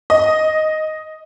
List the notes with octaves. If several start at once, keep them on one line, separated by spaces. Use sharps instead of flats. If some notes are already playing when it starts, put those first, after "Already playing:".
D#5